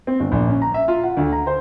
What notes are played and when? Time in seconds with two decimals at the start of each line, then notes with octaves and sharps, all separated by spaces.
0.07 C4
0.20 G1
0.32 A#1
0.48 C#4
0.62 A#5
0.74 E5
0.88 F4
1.03 F#5
1.17 D2
1.32 A#5
1.47 C5